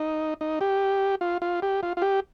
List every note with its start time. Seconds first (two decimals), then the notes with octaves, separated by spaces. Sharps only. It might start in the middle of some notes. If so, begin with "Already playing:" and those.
Already playing: D#4
0.41 D#4
0.61 G4
1.21 F4
1.42 F4
1.62 G4
1.83 F4
1.97 F4
2.02 G4